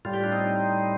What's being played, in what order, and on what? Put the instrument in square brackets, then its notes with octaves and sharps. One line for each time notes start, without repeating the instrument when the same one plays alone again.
[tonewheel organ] A2 G3 F4
G4
D4 F4
C4 D#4